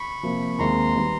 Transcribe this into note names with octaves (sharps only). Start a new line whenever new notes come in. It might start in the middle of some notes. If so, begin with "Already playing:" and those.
Already playing: B5 C#6
C3 F3 A#3
D#2 D#3 G#3 C4 E4 A#5 C6
D#3 G3 B3